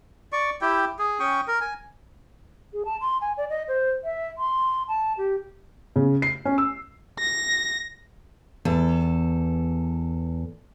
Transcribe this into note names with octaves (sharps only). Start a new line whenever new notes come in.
D5 C#6
E4 G4 G5
G#4
C#4 G5 C#6 D#6
A#4
G#5
G#4
A5
C6
G#5
D5
D#5
C5
E5
C6
A5
G4
C#3
C7
C#4
E6
A#6
E2 A4